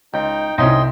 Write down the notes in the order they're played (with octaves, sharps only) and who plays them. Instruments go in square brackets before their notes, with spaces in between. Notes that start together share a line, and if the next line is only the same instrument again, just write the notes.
[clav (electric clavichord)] C#2 [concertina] D#4 G5
[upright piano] C2 [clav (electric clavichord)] F3 C#4 D#4 [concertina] D#5 G5 C6